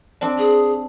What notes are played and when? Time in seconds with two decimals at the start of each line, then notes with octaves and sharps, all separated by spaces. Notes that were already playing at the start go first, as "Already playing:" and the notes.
0.21 C4 D4
0.39 G#4